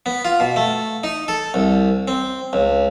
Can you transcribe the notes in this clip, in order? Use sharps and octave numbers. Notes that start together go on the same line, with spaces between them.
B3
F4
B2
A3
D#4
A4
C2
C4
C#2